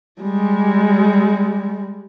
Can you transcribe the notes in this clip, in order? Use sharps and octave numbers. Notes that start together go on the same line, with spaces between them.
G3 G#3